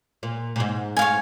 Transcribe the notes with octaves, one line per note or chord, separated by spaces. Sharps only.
A#2
A#2
G#2
G#2 C#5 F5 G#5